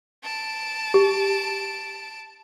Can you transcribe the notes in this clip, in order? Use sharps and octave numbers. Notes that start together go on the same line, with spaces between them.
A5 D7
G4